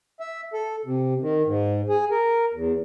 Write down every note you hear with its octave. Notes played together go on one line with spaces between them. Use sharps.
E5
A4
C3
D#3
G#2
G#4
A#4
E2